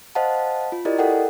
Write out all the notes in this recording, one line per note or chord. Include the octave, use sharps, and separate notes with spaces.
C5 D#5 F5 F#5 A5
F4
E4 G4 A#4 D5 D#5
A4 A#4 F#5 G5